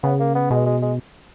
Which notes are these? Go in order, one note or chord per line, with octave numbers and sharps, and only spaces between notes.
C#3 B3
A#3
B3
B2 G#3
G#3
G#3